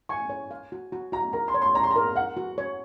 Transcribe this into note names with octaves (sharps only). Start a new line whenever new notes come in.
G#5 C#6
C#5
F5
F#4
F#4
F#4 A#5
A#4 A#5
C6
C#5
C6
C#5 A#5
C6
A#5
A#4
F5 F#5
F#4
C#5